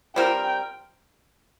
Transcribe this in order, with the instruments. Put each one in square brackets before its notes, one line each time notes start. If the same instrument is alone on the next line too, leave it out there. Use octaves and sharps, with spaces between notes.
[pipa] G3 C4 F4 A#4 [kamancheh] G5